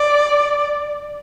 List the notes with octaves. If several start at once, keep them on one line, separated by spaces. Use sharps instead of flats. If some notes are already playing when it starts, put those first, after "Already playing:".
Already playing: D5